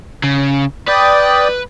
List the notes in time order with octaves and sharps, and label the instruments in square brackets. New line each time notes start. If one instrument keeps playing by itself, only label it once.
[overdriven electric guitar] C#3
[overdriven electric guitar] B4 [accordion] D5 G5 D#6